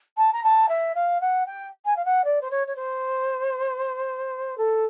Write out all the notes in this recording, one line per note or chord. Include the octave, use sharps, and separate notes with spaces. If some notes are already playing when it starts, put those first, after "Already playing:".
A5
A#5
A5
E5
F5
F#5
G5
G#5
F5
F#5
D5
C5
C#5
C#5
C5
A4